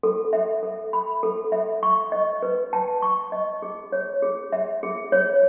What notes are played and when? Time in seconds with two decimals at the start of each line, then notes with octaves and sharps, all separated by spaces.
0.03 A4
0.33 E5
0.63 A4
0.93 B5
1.23 A4
1.52 E5
1.83 C#6
2.12 D#5
2.43 B4
2.73 A5
3.02 C#6
3.32 D#5
3.62 G#4
3.92 C#5
4.22 G#4
4.52 E5
4.83 G#4
5.12 C#5